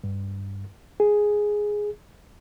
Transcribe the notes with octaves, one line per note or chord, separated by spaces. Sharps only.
G2
G#4